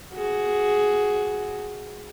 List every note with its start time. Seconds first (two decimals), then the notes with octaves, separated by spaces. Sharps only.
0.14 F#4 G#4